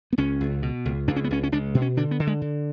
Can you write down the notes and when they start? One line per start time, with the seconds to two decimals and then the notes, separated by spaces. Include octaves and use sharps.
0.13 B3
0.18 C#2 C#4
0.41 C#2
0.62 B2
0.85 C#2
1.08 C#2 D4
1.16 C#4
1.24 B3
1.30 C#2 C#4
1.43 C#4
1.52 C#2 D4
1.75 B2
1.81 C#4
1.97 D3 D4
2.11 B3
2.20 D3
2.27 G#3
2.42 D3